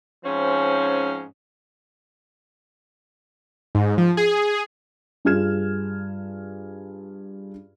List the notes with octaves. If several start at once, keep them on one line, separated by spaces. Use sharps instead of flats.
G#2 F3 C4 C#4
G#2
F3
G#4
G2 F4 G#4 F6 G#6 E7